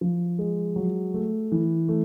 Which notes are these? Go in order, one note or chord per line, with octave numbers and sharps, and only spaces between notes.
F3
G#3
F#3
A3
E3
A3